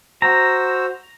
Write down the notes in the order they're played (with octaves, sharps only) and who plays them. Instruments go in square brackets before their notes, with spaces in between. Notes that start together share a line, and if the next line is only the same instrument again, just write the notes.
[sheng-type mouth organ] F#4 C5 E6 [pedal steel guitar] A#5